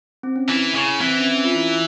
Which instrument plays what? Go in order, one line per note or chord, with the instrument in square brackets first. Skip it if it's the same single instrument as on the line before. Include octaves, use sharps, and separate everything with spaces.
[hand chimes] C4
C#4
[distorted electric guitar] E3 [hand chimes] E4
[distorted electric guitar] C#3
[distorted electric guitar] E3 [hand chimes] C4
[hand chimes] C4
C#4
C#4
F4
E4